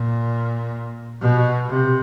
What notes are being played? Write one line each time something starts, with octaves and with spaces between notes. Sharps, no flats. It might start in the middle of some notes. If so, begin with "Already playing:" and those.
Already playing: A#2
B2
C3